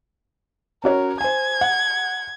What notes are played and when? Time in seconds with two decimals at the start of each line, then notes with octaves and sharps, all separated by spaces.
0.84 C#4 F#4 A#4 C#5
1.21 C5 G#5 G#6
1.61 F#5